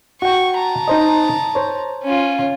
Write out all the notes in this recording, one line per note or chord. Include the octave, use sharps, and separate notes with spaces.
F#4 G5 C#6
A5 A#5
D#4 C5 D#5
C5 C#5
C#4 F4